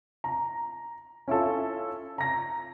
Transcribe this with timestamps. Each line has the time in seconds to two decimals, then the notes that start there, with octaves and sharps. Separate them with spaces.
0.24 A#5
1.28 C#4 E4 F4 A4
2.18 A#5 A#6